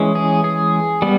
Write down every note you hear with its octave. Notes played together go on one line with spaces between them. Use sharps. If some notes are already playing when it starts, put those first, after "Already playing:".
Already playing: E3 G#3 C#4
G#4
G#4
G3 B3